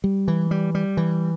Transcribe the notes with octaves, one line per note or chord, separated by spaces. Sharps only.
G3
E3
G3
G3
E3